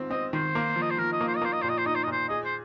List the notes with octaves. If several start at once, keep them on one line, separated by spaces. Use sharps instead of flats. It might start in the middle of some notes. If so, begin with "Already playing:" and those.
Already playing: G#2 D#3 C4 F4
C4 D#5
D#3 C5
A#3
F3
D#5
C5
F3 A#4
D#5
A#3
C5
D#5
A#3 C5
D#5
A#2 C5
D#5
C5
D#4 D#5
C5
D#5
A#2 C5
G#4 D#5
C5